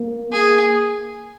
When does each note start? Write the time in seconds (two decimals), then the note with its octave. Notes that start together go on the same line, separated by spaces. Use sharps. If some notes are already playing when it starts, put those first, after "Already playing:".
Already playing: A#3
0.32 A#3 G#4